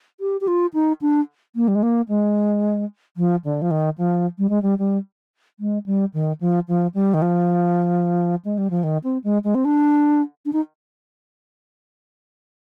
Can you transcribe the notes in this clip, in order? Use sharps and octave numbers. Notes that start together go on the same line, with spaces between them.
G4
G4
F4
D#4
D4
A#3
G3
G#3
A#3
G#3
F3
D3
F3
D#3
F3
G3
G#3
G3
G3
G#3
G3
D#3
F3
F3
G3
D#3
F3
G#3
G3
F3
D#3
C4
G#3
G#3
C4
D4
D4
D#4